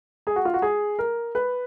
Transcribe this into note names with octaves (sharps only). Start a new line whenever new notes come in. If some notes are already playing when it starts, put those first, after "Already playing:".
G#4
F#4
F4
F#4
G#4
A#4
B4